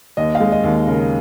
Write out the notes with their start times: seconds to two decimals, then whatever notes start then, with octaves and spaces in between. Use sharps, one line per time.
0.17 D#2 D#5
0.35 F5
0.40 G#3
0.52 D#5
0.64 D#2
0.87 C#3 A#4